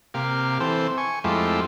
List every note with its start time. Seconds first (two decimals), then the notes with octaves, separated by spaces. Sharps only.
0.14 C3 A#3 G4 F5
0.60 E3 C4 A4 C5
0.98 G#5 C#6
1.24 F2 G#3 A3 E4 F4 G4